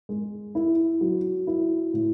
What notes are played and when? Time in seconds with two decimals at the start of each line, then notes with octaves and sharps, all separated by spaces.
0.09 G#3
0.55 E4
1.01 F#3
1.47 E4
1.94 A2